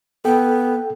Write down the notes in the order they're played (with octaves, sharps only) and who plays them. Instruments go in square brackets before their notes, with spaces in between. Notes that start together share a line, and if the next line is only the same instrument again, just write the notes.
[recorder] B3 [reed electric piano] A4 G5